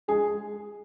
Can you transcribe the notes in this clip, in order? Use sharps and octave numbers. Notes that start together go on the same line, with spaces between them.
G#3 G#4